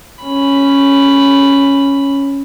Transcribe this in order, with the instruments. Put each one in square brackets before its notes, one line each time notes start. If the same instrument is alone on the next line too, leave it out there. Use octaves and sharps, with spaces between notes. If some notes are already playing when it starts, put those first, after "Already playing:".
[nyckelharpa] C#4 B5